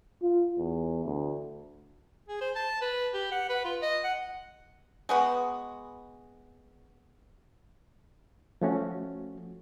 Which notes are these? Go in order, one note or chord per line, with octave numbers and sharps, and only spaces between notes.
F4
E2
D2
G#4
C5
A5
B4
G4
F#5
B4
F4
D#5
F#5
G#3 B3 F#4
F3 A3 C#4 F#4